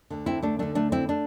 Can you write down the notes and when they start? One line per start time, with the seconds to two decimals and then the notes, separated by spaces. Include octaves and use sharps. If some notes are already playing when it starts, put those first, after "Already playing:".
0.10 D2 D3
0.26 C4 E4
0.43 A3 D4
0.59 D2 D3 A3 D4
0.75 A3 D4
0.92 C4 E4
1.09 A3 D4